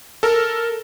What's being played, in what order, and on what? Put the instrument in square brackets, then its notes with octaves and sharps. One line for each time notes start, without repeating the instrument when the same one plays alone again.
[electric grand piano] A4 A#4